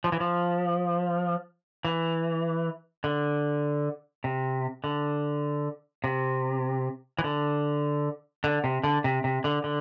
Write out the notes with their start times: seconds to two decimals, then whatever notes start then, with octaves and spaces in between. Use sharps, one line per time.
0.04 F3
0.12 E3
0.20 F3
1.85 E3
3.04 D3
4.24 C3
4.84 D3
6.04 C3
7.19 E3
7.24 D3
8.44 D3
8.64 C3
8.83 D3
9.04 C3
9.24 C3
9.44 D3
9.64 D3